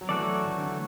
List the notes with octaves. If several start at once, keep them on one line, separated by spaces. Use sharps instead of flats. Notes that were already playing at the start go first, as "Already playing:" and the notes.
F#3
E3 A3 F#4 A4 D5
F#3
E3
E3
D3